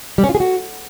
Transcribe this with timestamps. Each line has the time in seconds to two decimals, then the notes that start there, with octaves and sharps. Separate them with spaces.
0.18 G3
0.24 C#4
0.29 F4
0.35 G#4
0.40 F#4